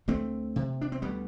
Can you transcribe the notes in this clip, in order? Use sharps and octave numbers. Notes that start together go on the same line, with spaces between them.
D2 A3 C4
C3
D4
C4
D2 G3 B3